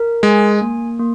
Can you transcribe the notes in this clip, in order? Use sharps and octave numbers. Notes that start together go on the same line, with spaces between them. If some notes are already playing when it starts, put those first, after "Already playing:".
Already playing: A#4
G#3 G#5
A#3
A#3